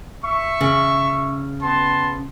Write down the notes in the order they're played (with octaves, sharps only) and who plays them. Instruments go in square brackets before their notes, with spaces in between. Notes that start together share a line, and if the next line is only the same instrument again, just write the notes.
[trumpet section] E5 C#6
[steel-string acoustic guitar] C#3
[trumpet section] B3 A5 C6